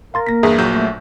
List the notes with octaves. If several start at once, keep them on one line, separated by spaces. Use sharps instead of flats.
A#4 F5 C6 A6
A#3 A#6 B6
E2 G2 G#4 E5
A#1 F#3 G6
A3